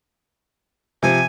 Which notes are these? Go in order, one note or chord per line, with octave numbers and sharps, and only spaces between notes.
C3 F3 G#5